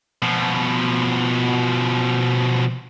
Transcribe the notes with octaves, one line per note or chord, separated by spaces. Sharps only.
B2 F3